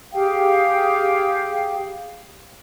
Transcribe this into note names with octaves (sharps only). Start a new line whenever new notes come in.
G4 G#4 F5 G5